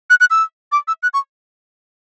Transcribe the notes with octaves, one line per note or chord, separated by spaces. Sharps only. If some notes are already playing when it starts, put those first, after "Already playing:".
F#6
F#6
E6
D6
E6
F#6
C#6